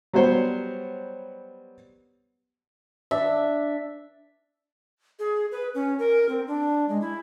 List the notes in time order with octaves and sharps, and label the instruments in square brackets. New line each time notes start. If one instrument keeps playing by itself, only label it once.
[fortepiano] F#3 G3 B3 C5 C#5
[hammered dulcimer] D4 E5
[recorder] G#4
B4
C#4
A#4
C4
D4
G#3
E4